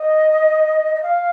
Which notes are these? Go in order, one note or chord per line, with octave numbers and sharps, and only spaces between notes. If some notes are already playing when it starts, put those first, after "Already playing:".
Already playing: D#5
D#5
F5